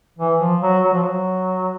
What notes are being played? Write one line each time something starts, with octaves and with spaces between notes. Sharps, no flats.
E3
F3
F#3
F#3
F3
F#3